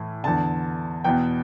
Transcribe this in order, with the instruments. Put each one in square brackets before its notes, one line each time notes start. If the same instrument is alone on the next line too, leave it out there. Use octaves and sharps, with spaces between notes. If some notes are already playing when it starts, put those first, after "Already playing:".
Already playing: [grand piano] A2 E3
E2 D3 A5
E2 B2 G5